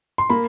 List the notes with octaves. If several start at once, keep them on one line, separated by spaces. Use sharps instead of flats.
C6
A#3 B5